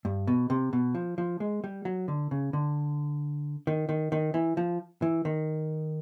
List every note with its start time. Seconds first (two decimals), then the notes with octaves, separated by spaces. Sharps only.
0.05 G2
0.27 B2
0.50 C3
0.73 B2
0.95 F3
1.18 F3
1.40 G#3
1.64 G3
1.85 F#3
2.08 D3
2.31 C#3
2.53 D3
3.67 D#3
3.89 D#3
4.12 D#3
4.34 E3
4.57 F3
5.02 E3
5.25 D#3